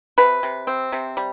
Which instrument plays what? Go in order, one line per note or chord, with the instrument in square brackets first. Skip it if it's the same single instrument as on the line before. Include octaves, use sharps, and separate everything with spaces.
[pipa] C3 B4
C3
C4
C3
G3